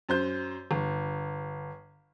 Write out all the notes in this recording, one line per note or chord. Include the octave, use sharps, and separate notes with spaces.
F#2 C5 G6
G1